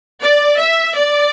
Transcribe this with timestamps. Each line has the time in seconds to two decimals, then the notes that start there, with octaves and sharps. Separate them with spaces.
0.22 D5
0.59 E5
0.96 D5